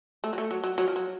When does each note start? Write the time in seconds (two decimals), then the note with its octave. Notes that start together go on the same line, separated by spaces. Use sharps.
0.24 A3
0.33 F#3
0.38 A3
0.51 F#3
0.64 F#3
0.78 F#3
0.88 F3
0.96 F#3